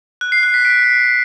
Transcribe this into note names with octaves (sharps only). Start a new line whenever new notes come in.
F#6
C7
F#6
B6
D7